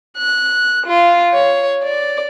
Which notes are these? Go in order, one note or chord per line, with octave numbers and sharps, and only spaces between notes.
F#6
F4
C#5
D5